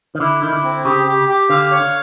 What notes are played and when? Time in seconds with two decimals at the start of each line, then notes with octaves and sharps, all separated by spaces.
0.15 D#3
0.20 D3 E4
0.43 D#3 E4
0.53 D3
0.64 C4
0.85 C#3 G4
1.07 G4
1.29 G4
1.50 D3 F5
1.71 C#5
1.82 D3